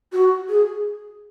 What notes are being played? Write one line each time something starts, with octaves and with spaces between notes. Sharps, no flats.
F#4
G#4